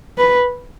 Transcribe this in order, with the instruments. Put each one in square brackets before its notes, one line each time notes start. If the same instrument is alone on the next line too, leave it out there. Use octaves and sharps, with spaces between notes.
[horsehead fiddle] B4